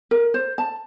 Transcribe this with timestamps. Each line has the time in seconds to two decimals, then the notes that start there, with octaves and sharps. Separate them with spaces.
0.11 A#4
0.34 C5
0.58 A5